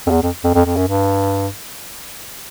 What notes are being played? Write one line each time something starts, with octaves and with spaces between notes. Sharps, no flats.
F2
E2
F2
F2
F2
F2
F#2
G2